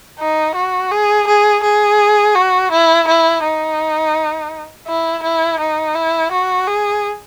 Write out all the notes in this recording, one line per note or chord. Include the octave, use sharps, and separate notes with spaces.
D#4
F#4
G#4
G#4
G#4
F#4
E4
E4
D#4
E4
E4
D#4
E4
F#4
G#4